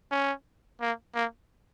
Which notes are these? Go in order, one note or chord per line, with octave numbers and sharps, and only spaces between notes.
C#4
A#3
A#3